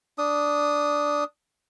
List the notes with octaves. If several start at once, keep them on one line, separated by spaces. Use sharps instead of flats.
D4 D#6